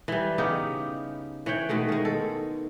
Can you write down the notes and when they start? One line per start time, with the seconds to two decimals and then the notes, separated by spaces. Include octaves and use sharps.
0.08 E3 G3
0.38 C#3 B3 D#4 G4
1.46 E3 C#5 F#5 G5
1.69 B2 D#3 G#3 A3
1.89 D#3 G#3
2.05 A4